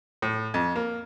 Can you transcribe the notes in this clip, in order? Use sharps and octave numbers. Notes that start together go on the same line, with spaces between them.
A2
F2
A#3